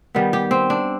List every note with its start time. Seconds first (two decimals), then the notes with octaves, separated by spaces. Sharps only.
0.15 D#3 G3 B3
0.33 G4
0.51 C4
0.70 D4